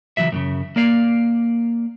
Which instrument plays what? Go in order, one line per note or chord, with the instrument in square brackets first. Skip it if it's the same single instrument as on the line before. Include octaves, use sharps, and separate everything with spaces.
[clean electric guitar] C#2 A2 E3 F#3 E5
F#2 A2 C#3
A#3 D5 F5